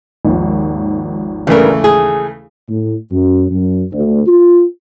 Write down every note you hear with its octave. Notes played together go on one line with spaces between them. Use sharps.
G#1 D#2 F3
G2 C#3 E3 A3 A#4
G#4
A2
F#2
F#2
D2
F4